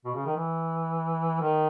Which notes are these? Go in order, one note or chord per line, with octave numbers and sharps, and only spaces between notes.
B2
C#3
D#3
E3
D#3